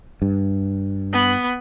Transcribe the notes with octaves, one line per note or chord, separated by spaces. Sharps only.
G2
B3